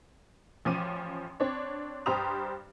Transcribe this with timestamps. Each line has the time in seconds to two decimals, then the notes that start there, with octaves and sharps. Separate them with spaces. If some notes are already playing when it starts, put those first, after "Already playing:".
0.65 A1 F3 C#4 D6 D#7
1.40 C4 D4 C#5
2.06 G2 G4 C5 A#5 D#6 F7